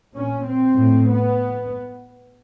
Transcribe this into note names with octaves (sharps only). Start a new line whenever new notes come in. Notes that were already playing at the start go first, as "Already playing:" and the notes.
A#2 C#4
C4
A2
B3